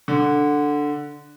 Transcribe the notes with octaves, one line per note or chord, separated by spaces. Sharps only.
D3